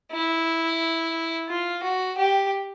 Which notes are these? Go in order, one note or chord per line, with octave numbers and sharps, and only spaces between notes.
E4
F4
F#4
G4